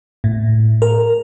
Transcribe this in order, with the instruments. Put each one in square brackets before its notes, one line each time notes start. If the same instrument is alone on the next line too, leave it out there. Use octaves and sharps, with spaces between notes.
[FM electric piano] A2
A#4